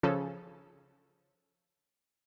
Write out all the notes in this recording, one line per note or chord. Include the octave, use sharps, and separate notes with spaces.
C#3 F3 C#4 A4